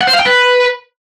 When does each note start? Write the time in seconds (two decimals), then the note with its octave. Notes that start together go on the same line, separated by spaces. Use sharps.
0.01 F#5
0.07 C5
0.13 F5
0.19 G5
0.26 B4